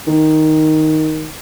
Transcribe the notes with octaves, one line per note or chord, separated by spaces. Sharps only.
D#3